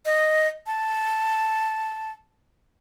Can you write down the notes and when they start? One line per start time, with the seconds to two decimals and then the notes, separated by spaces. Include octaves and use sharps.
0.05 D#5
0.67 A5